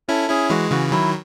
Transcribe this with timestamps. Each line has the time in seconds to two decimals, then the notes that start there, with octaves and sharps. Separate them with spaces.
0.08 C#4 E4 A4
0.29 C#4 E4 G#4
0.50 E3 G#3 F#4
0.71 C#3 E3 F#4
0.92 D#3 F#3 E4